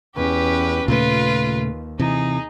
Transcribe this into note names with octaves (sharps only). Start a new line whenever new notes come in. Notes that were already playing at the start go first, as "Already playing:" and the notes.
E2 C#4 G4 B4
D#2 A#2 C#3 A3 F4 B4
C3 E3 D#4 G#4